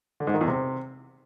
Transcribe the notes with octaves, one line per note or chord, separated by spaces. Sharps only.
D3
G#2
D#3
E2
C3